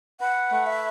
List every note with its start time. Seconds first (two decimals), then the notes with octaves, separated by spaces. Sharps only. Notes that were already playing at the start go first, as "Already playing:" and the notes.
0.20 B4 F#5
0.51 A3
0.66 E5